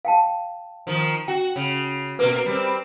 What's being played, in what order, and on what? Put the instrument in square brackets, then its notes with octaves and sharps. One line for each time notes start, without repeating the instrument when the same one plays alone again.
[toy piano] F5 G5 A5
[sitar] D#3 F3
[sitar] F#4 [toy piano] G5
[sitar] C#3
[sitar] B2 A#3 [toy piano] B4 D6
[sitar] G3 C4